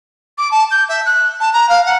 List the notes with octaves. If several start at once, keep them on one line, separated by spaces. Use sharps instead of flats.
D6
A5
G6
E5
F#6
A5
A#5
F5
F#5